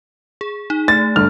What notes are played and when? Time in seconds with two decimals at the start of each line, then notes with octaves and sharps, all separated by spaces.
0.41 G#4
0.70 D#4
0.88 A3 A6
1.16 G1 F6